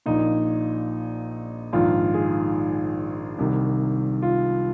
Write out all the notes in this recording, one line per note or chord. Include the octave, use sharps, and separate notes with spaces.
A#1 A#2 D#4
A#1 G#2 D#3 F4
G#4
C2 C3 D#3
F4